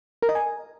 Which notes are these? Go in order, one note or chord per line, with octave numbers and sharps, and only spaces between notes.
A#4
D#5
G#5